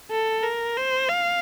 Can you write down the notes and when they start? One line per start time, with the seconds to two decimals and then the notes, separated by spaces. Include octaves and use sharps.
0.11 A4
0.43 A#4
0.77 C5
1.09 F5